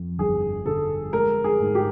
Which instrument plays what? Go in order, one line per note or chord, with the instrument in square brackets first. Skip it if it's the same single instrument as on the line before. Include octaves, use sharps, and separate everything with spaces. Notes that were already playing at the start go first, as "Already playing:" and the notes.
Already playing: [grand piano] F2
[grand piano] G1 [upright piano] G#4
[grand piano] D3 [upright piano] A4
[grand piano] G#3 [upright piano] A#4
[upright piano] G#4
[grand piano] G#2
[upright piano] G4